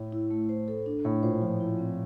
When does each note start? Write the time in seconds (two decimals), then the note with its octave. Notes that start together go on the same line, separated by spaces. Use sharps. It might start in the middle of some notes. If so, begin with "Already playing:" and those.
Already playing: A2
0.12 E4
0.31 A3
0.49 C5
0.68 A4
0.86 D4
1.05 A2 A3
1.23 A#2 C5
1.41 F3 F4
1.60 E4
1.78 C4